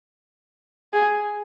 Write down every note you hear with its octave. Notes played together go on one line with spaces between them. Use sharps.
G#4